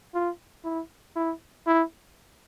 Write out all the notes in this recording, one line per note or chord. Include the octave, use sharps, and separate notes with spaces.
F4
E4
E4
E4